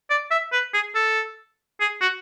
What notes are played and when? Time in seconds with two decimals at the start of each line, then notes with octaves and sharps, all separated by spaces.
0.10 D5
0.31 E5
0.52 B4
0.74 G#4
0.95 A4
1.80 G#4
2.01 F#4